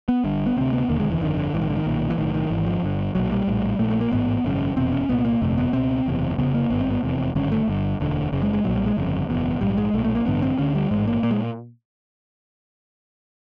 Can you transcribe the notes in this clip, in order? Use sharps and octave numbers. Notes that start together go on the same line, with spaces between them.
B3
G1 G2 D3
B3
D2 C3 C4
B3
E1 D#2 D3 A#3
G#3
E3
G1 F2 D3 D#3
D3
A#1 G#2 E3
D#3
D3
D#3
B1 A#2
E3
B1 A2 D#3
D#3
G#1 G#2 E3
F3
G1 G2 D3
B1 A#2 F#3
G3
A#1 A2
A#1 A#2 A3
A3
A#3
A1 G#2 B3
G#1 F#2 C#3
F1 E2 B2 C4
C#4
C2 A#2 B3
A#3
G1 F2 C3 A3
B3
C#2 B2 C4
F#1 E2 C3
F1 E2 C#3 B3
A#3
G#1 G2 D3 B3
C4
B3
F1 E2 C3
G#1 G2 D3 C#4
A3
G1 G2 D3
E1 D2 D3
F#1 F#2 C#3
G#3
G#3
B1 A#2 F#3
G3
G#3
G1 F2 C#3
F#1 E2 B2
A#1 G#2 G3
G#3
B1 A#2 A3
A3
A#3
A1 G2 D3 B3
C4
D2 D3 C#4
G3
A1 G#2 G#3
A#3
A#2 A#3
G#3